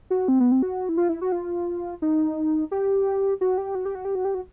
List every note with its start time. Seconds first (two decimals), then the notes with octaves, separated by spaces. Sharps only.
0.10 F#4
0.28 C4
0.40 B3
0.52 C4
0.62 F#4
0.89 E4
0.97 F4
1.09 E4
1.21 F#4
1.32 F4
2.02 D#4
2.71 G4
3.41 F#4
3.58 G4
3.75 F#4
3.85 G4
3.95 F#4
4.05 G4
4.15 F#4
4.25 G4
4.35 F#4